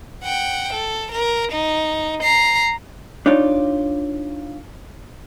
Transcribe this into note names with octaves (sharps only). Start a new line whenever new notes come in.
F#5 G5
A4
A#4
D#4
A#5 C7
D4 D#4 F4 C#5 D5